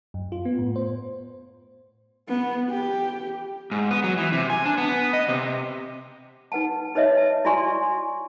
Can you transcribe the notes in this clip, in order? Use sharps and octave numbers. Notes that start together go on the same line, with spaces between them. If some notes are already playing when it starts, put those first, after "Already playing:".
F#2
F4
B3
A2
C5
B3
G4
G#2
B3
F#3
E3
C3
G#5
D4
B3
D#5
C3
D#4 B4 F#5 A5
D#4 B4 C#5 D#5 E5
A5
E4 F#4 D5 G#5 C6 C#6